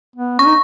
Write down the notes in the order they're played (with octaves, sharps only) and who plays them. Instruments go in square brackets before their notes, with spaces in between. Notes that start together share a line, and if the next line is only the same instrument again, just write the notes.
[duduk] B3
[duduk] C#4 [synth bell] C#6
[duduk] D#4